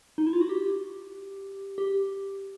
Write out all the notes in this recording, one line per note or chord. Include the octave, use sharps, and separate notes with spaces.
D#4
E4
F4
F#4
G4
G4